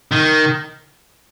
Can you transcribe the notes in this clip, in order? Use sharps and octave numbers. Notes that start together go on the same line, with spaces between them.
D#3